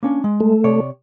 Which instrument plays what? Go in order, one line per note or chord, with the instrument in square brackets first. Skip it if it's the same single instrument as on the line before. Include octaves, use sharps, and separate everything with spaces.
[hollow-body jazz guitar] A#3 C#4 D4
G#3
[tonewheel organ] A3
[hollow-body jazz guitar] C3 C#5 D5